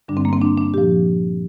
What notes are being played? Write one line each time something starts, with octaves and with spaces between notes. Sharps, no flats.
G2 D3 G3 D4
C4
A#3
C4
D4
D4
A#2 F3 G4